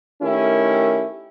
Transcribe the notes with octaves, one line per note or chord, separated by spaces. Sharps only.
D#3 A3 C#4 E4 G4 A#4